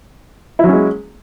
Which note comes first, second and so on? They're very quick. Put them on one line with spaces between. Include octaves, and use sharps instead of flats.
E4 F#3 C#4 G#3